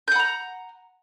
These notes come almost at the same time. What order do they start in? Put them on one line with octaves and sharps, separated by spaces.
G6 F#5 B5 A#5